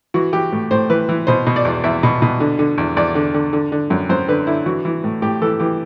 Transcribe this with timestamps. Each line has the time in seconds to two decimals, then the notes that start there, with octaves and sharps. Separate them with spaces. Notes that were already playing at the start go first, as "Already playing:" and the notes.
0.14 E3 F#4
0.33 E3 G4
0.52 A2
0.71 A2 C5
0.90 E3 B4
1.09 E3
1.27 B2 C5
1.47 B2
1.56 D5
1.65 E2
1.84 E2 E5
2.03 B2
2.22 B2
2.40 D3
2.59 D3
2.78 E2
2.97 E2 D5
3.15 D3
3.34 D3
3.53 D3
3.72 D3
3.90 F#2
4.09 F#2 C5
4.28 D3 B4
4.47 D3 E4
4.66 E3 F#4
4.85 E3
5.04 A2
5.22 A2 G4
5.42 E3 A4
5.60 E3 G4